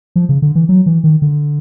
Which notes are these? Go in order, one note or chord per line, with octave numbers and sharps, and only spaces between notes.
F3
C#3
D3
E3
F#3
E3
D#3
D3